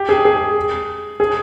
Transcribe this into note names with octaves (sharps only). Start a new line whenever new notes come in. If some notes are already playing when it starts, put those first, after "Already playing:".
Already playing: G4
G#4
G#4
G#4